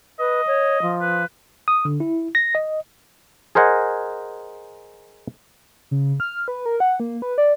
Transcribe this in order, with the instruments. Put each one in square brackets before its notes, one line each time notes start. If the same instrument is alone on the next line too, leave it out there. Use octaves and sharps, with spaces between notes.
[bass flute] B4 [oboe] D#5
[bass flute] C#5
F3
[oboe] B4
[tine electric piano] D#6
D3
E4
A#6
D#5
[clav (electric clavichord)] G#4 A#4 C5 D#5 F#5 G#5
[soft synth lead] C#3
F6
B4
A#4
F#5
A#3
B4
D5